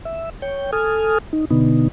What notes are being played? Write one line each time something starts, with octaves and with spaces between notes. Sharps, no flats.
E5
C#5 G5
A4 G#5 D#6 F6
D#4
B2 D3 B3 D#4